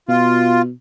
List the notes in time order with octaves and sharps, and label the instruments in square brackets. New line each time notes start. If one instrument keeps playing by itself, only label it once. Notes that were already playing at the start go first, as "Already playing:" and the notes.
[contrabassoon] B2 [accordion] F4